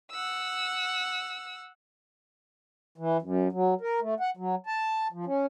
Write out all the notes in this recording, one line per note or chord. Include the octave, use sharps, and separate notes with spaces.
F#5 E6
E3
F#2
F#3
A#4
A3
F#5
F#3
A5
F3
C#4